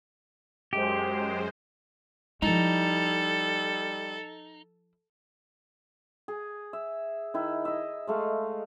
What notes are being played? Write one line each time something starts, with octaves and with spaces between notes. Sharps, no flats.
F#2 G#3 G4 C5
F3 G3 D#4 E4 A4
G#4
E5
D#3 E4
D#5 E5
G#3 A3 F5